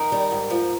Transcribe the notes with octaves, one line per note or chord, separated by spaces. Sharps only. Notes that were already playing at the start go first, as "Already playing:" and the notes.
Already playing: D#3 A#4
G3
G#2
F3